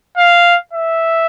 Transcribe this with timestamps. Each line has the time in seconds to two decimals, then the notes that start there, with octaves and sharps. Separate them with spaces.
0.17 F5
0.73 E5